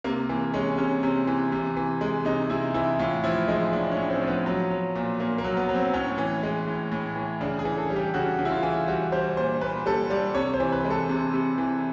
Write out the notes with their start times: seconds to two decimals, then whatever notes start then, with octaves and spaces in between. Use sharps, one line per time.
0.04 C3 A#3
0.29 E3 A#3
0.54 G#3 C#4
0.78 C3 C#4
1.03 C3
1.27 E3
1.52 C3
1.77 E3
2.01 G#3
2.25 C3 D#4
2.50 C3 E4
2.74 E3 E4
2.99 A2 F4
3.24 F3 E4
3.48 G#3 D#4
3.73 A2 D4
3.91 C#4
3.97 A2
4.10 C4
4.22 F3
4.28 B3
4.46 F#3
4.71 F#3
4.95 A#2
5.19 A#2 A#3
5.38 A#3
5.44 F#3
5.57 B3
5.69 F#3
5.74 C4
5.93 A2 C#4
6.18 E3
6.43 G#3
6.67 A2
6.92 A2
7.16 E3
7.41 C#3 D4
7.59 G#4
7.65 E3
7.77 A4
7.90 G3
7.96 G4
8.14 C#3 F#4
8.39 C#3
8.45 E4
8.51 F4
8.63 E3
8.88 G3 F#4
9.12 G3 C5
9.37 A#2 C5
9.61 A#2 B4
9.86 G3 A4
10.10 G3 D5
10.35 C3 C#5
10.54 C5
10.60 E3
10.73 B4
10.84 G#3
10.90 A4
11.09 C3
11.33 C3
11.58 E3